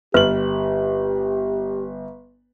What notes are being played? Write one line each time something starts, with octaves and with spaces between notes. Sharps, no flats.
G1 G4 B4 F#7